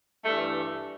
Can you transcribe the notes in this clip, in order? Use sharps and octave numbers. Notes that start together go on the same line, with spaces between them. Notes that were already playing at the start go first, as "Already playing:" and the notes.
G2 E3 A3